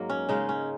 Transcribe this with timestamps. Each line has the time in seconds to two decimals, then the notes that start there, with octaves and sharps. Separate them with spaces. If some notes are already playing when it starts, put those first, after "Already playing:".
Already playing: G#2 F#3 A#3
0.10 C#4
0.29 C#3 G#3 D#4
0.49 C#4